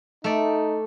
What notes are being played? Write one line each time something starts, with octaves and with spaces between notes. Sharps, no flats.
A3 D#4 D5